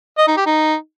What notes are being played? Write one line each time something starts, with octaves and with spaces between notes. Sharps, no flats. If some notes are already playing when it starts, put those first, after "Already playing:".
D#5
D#4
G4
D#4